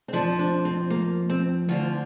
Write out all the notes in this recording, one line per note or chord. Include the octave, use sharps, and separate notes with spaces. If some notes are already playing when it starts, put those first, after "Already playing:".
C4
F2 F3 D4
D4
C4
A#3
C4
D2 D3 F3 F4